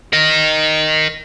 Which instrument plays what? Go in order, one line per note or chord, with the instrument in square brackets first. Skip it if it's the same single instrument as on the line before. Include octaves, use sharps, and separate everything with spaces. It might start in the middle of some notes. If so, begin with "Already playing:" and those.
[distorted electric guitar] A#4 D#5